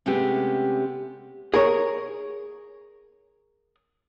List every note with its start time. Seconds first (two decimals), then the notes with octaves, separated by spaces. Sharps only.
0.06 C3 G#3 A3 B3 C#4 G4
1.54 G#4 A#4 C#5